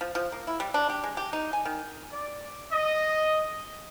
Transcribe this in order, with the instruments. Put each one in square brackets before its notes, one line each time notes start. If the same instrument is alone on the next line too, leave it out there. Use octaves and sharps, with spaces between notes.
[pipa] F3
F3
A#3
E4
G3
D4
G4
G#3
G4
D#4
G#5
D#3
[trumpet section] D5
D#5